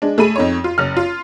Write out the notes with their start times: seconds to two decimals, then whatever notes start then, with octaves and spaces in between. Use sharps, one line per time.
0.02 G#3 D4
0.18 A3 G#4 B5 D#7
0.36 F2 D#4 C#5
0.64 F4
0.78 F#1 F6
0.97 F4